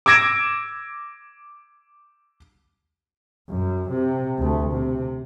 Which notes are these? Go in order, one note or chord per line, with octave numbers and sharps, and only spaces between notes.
D6 E6 G#6 A#6 D7 E7
F#2
C3
D2 A3
C3